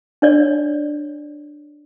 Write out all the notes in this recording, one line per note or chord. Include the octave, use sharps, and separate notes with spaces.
D4 C#5 D5